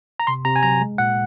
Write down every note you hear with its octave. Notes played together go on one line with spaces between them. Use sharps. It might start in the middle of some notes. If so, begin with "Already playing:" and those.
A#5
C3 C6
C3 A#5
G#5
F#3 A#5
G#3
A#2 F#5